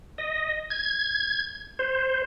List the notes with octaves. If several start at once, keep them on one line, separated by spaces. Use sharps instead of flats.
D#5
G#6
C5